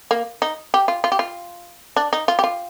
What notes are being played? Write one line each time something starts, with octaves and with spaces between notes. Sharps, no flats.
A#3
D#4
G4
F4
F4
G4
F4
D4
D#4
F4
G4
F4